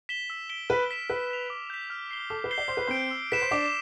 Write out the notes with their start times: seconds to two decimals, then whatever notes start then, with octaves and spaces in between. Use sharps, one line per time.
0.09 B6 E7 G7
0.30 E6
0.50 B6 D7 G7
0.69 B4 F6
0.91 B6 E7 G7
1.10 B4 E6
1.30 B6 F7
1.50 D6
1.70 G6 B6
1.90 F6
2.11 C7 G7
2.30 A4 D6
2.44 B4
2.51 G6 C7 G7
2.58 D5
2.68 C5 D6
2.77 B4
2.87 C4 C5 G6 D7
3.11 E6
3.32 B4 B6 E7
3.41 C5
3.51 D4 D5 D6